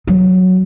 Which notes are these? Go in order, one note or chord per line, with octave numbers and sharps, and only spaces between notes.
F#3